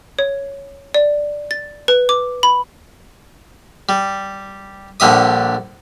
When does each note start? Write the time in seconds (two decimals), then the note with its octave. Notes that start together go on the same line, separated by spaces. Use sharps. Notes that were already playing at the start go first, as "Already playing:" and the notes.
0.19 C#5
0.94 D5
1.51 A6
1.88 B4
2.09 D6
2.43 B5
3.89 G3
5.00 A#1 D3 G3 E5 D#6